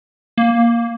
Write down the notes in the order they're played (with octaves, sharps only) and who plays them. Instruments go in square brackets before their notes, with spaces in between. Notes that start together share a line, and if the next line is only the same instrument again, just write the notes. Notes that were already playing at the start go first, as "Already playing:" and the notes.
[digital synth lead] A#3